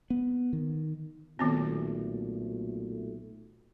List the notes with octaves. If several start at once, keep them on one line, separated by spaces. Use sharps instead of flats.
B3
D#3
B1 A#2 D#3 A3 B3 C4